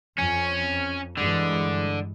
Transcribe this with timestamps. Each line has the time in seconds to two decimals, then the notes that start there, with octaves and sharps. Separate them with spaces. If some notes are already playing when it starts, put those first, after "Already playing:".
0.18 F2 C#4
1.17 G2 D3 E3 G#3